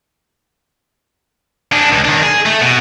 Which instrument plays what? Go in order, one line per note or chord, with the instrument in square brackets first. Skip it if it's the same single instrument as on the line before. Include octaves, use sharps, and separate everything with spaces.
[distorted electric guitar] D4 G#4
C#2
D#3 D4
G#4
A3
B2